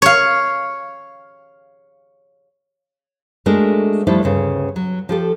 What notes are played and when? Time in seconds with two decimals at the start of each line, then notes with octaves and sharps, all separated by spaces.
0.02 C#5 F5
3.46 G#3 A3 D4 F#4 A#4
4.07 F3 G3 A3 D4 E4
4.23 D2 G2 C#3
4.76 F#3
5.09 F3 G4 A4